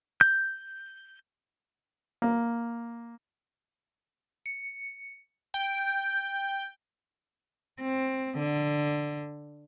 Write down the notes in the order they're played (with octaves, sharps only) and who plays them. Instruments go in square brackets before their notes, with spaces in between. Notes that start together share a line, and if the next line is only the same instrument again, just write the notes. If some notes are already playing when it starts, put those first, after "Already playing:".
[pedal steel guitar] G6
[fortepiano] A#3
[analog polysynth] C#7
G5
[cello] C4
D3